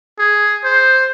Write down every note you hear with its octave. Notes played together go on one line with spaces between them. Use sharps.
G#4
C5